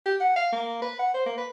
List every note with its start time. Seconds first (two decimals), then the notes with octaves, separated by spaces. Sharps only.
0.06 G4
0.20 F#5
0.36 F5
0.52 A#3
0.82 B4
0.99 F#5
1.14 C5
1.26 A#3
1.37 B4